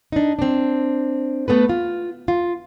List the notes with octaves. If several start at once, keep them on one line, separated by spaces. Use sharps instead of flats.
D4 D#4
C4 D4
A3 B3 A4 B4
F4
F4